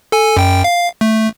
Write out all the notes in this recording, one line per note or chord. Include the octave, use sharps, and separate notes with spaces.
A4 G#5
F#2 G5
F5
A3